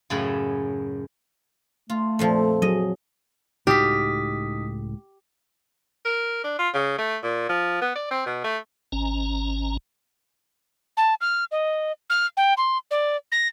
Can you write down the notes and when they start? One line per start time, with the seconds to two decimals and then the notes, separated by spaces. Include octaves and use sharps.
0.10 F#2 A2 C#3 A4 B5
1.90 A3 F4
2.19 F2 A#2 F3 A4
2.62 F#3 G#4 D#5
3.67 C#2 A2 D#4 F#4 G4 D#6 B6
6.05 A#4
6.44 D4
6.59 F4
6.74 C#3
6.98 A3
7.23 A#2
7.49 F3
7.81 B3
7.95 D5
8.11 C4
8.26 B2
8.44 A3
8.92 G#1 C#4 A#5
10.97 A5
11.21 F6
11.52 D#5
12.10 F6
12.37 G5
12.57 C6
12.91 D5
13.32 A#6